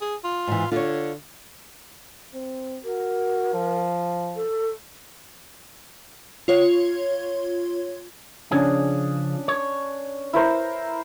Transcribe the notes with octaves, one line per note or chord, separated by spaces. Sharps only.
G#4
F4
G#2 E3
D3 F4 C#5
C4
F#4 A#4
F3
A4
F4 C#5
C#3 F3 C#4 D4 G#4
C#5
E4 A#4 C5